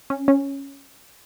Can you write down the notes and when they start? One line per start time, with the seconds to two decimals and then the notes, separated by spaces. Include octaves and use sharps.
0.10 C#4
0.28 C#4